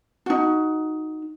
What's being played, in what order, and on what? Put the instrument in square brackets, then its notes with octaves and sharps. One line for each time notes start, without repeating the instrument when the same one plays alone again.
[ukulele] D#4 F#4